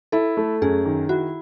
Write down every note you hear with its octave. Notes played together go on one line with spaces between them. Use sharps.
E4 A4
A3
F#2 G#4
D#3
E4 F#4